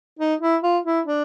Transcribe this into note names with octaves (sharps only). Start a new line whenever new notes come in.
D#4
E4
F4
E4
D4